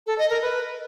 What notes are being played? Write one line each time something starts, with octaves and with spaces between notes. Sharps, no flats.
A4
D#5
A#4
B4